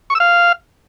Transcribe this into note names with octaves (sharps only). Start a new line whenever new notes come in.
C#6
E6
F5